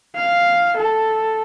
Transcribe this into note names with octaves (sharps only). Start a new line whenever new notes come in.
F5
A4